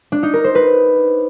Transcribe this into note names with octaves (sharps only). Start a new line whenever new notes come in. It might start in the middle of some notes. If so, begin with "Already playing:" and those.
D4
D#4
A#4
C5
B4